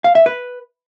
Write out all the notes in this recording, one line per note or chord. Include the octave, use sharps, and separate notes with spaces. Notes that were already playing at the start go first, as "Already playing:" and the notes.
F5
E5
B4